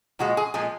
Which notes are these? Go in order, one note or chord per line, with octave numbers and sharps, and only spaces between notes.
A#2 F3 G#3 F#4
G#4
A#2 F3 G#3 G#4